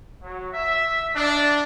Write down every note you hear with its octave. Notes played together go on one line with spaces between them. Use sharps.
F#3
E5
D4